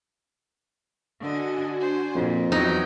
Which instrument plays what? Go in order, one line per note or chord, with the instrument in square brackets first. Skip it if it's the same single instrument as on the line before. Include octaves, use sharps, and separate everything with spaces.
[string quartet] D3 D#5 [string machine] D4 F#4 G#5
[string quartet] C5
[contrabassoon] F2 [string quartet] A#2
[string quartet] E2 F#3 G5 [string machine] E3 F#4 [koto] D#4